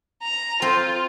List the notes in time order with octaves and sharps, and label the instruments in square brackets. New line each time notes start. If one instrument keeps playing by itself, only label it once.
[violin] A#5
[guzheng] C4 C5 [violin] F4